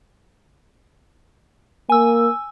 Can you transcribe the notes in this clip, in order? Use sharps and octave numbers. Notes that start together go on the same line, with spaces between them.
A#3 G#5 E6